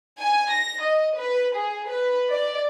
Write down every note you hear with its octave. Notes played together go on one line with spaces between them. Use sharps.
G#5
A#6
D#5
B4
G#4
B4
D5